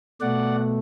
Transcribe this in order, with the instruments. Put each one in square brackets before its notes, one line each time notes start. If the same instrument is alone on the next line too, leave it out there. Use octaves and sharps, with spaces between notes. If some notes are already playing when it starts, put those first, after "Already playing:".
[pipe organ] B2 A3 D5 F#5